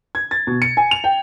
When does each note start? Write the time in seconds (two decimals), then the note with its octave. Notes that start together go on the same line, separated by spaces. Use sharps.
0.15 G#6
0.31 A6
0.47 B2
0.62 C#7
0.77 G#5
0.91 F7
1.04 G5